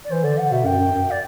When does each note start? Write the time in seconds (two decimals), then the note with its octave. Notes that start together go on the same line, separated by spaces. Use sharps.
0.04 D5
0.10 E3 C5
0.24 D3 D5
0.37 F#5
0.51 B2 E5
0.64 F#2 G5
0.78 F#2
0.92 F#2
1.10 D5